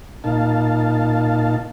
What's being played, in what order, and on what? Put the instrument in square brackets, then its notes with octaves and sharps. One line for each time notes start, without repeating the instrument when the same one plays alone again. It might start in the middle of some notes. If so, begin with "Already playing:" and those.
[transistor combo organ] A#2 D#4 F5 A5